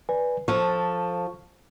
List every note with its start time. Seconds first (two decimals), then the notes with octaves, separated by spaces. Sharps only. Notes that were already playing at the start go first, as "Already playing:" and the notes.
0.09 B4 D5 G#5
0.48 F3 A4 C#6